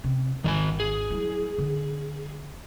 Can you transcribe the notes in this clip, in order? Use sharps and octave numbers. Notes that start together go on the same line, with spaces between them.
C3
G#1 D#3 D5 G#5
G#4
F#3 E4
D3